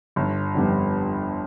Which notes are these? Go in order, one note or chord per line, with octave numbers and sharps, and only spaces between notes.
G1
F2 D3 G3 B3